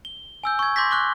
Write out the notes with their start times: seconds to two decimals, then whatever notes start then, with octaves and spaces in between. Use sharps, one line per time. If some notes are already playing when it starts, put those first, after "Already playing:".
0.05 G7
0.44 G#5 E6 G6
0.59 C#6 G#6
0.76 C6 D6 G6 G#6 A#6 B6
0.91 C#6 D6 F#6 G7